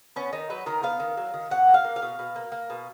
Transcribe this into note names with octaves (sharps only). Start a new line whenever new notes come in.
B3 C#4
D#3 D#4
F#3 B4
D#3 A#4
B3 F5
D#3
F#3
D#3
B2 F#5
A#3
F5
A#3
F5
B2
B2
A#3
A#3
B2